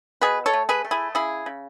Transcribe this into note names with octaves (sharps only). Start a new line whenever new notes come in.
B2 G#4 B4
A4 C#5
A3
G#4 B4
A3
E4 G#4
C#3 E4 G#4
C#3